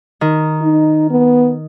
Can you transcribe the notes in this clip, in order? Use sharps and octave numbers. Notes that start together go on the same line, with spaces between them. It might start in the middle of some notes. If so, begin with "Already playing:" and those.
D#3
D#4
B3